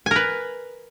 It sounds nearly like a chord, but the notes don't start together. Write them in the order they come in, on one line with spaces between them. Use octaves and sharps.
G#5 A#4 B4